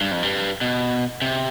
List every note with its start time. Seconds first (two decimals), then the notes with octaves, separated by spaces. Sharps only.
0.01 G2
0.12 F2
0.23 G2
0.61 B2
1.22 C3